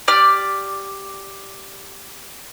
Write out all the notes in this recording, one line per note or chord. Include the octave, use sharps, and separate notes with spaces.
G4 D5 F6